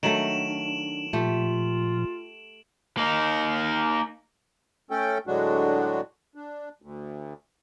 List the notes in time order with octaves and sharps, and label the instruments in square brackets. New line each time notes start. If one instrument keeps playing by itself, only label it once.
[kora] D#3 F#3 A3 [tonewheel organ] D4 [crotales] D7 E7 F#7
[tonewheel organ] A#2 F3 [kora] A3 G4 [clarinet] F4
[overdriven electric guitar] A#3 D#4
[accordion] A3 C#4 A4 G5
A2 D3 F#3 G#3 D4 F#4
D4
D2